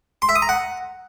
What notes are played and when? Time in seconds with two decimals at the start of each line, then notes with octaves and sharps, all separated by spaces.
0.22 C6
0.29 E5
0.36 D#6
0.42 A#5
0.49 F#5